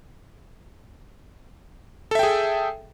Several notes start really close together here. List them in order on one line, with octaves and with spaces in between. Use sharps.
A4 E5 G5 G#4